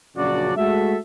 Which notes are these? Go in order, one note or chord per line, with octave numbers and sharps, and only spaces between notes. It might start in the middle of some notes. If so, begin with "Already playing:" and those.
A#1 F#2 C#3 D4 F#4 D5
G#3 A3 F#4 A4 E5